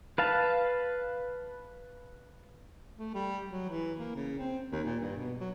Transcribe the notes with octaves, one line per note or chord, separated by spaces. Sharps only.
B4 F5 A5
A3
G3
F#3
E3
A#3
C#3
C4
D#2
A#2
G2
B2
F#3